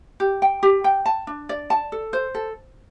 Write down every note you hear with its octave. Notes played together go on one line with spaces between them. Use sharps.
G4
G5
G4
G5
A5
D4
D5
A5
A4
C5
A4